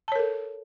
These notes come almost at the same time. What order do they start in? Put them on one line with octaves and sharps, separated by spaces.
A5 C#5 A#4 A4